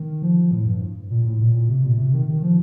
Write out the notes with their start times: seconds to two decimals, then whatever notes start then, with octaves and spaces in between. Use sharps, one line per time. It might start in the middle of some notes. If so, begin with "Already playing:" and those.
Already playing: D#3
0.22 F3
0.51 A2
0.66 G2
1.10 A#2
1.25 A2
1.40 A#2
1.69 C3
1.84 A#2
1.98 C3
2.13 D#3
2.28 D#3
2.43 F3